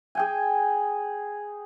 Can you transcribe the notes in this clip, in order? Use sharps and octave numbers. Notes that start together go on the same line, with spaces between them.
G#4 G5 G#5